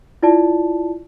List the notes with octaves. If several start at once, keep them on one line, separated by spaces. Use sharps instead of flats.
E4 F4 D5 A5